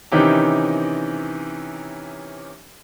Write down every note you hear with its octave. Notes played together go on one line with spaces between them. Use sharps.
C3 D#3 E3 C#4 D#4 G4